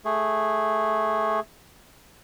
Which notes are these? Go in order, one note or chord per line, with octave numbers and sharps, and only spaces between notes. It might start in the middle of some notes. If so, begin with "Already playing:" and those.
A3 G#4